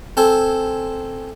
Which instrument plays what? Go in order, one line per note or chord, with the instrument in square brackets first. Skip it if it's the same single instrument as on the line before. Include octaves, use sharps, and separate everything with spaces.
[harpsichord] C4 A4 C5 G#5